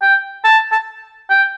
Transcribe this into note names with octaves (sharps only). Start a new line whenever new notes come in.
G5
A5
A5
G5